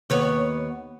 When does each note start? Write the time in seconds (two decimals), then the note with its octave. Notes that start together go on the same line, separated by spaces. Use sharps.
0.10 D#2 B3 C#5